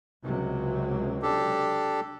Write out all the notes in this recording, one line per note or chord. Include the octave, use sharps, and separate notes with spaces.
C#2 C3 F#3
D4 G4 A4